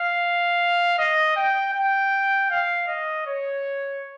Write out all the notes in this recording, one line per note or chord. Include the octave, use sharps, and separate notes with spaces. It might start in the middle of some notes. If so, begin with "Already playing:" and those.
Already playing: F5
D#5
G5
G5
F5
D#5
C#5